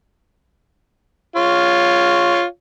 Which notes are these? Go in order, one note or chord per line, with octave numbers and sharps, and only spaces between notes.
F4 C#5